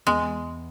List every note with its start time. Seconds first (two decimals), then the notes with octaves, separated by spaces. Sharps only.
0.07 E2 G#3